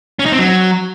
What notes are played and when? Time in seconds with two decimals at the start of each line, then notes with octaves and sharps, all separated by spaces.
0.19 C#4
0.26 D#4
0.32 C4
0.39 F#3